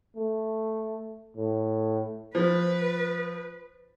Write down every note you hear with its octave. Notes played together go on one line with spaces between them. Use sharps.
A3
A2
F3 F4 B4 C5